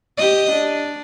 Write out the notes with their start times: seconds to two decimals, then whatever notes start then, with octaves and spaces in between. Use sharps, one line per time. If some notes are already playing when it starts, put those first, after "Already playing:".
0.18 G4 D#5
0.52 D4